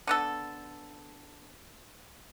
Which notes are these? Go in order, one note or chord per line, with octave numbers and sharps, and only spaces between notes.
D3 B3 A4